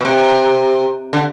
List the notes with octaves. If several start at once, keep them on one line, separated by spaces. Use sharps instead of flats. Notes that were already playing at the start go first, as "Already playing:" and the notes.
B2
C3
D3